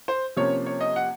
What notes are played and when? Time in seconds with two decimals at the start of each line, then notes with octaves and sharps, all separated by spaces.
0.08 C5
0.36 C3 F3 A#3 C#4 C#5
0.66 C#5
0.81 D#5
0.96 F#5